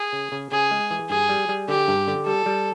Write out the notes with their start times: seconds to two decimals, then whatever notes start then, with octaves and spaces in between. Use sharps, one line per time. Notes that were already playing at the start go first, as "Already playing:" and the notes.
Already playing: G#4
0.13 C#3
0.32 C#3
0.52 C#3 G#4
0.71 G#3
0.91 E3
1.10 G2 G#4
1.29 G3
1.49 G3
1.68 D3 G4
1.88 G2
2.08 D3
2.26 G3 A4
2.46 G3